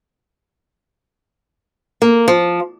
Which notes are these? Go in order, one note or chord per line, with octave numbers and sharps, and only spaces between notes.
A#3
F3